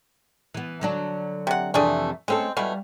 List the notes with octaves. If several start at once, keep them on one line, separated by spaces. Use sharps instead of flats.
E3 B3
D3 F#3 D4
C3 F#5
F2 C3 E3 A3 D4 G#4
G#3 A3 C4 C#4 A4
B2 E3 G3 A3 F5